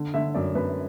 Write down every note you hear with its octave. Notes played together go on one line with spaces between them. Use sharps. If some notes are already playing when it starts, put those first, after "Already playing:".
Already playing: D3
D3 E5
F#2 D5
F#2 B4